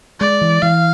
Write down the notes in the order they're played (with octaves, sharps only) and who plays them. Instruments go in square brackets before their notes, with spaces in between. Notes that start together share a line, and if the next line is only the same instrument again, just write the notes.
[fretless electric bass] G#3 [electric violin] D5
[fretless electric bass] E3
[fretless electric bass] E3 [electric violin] F5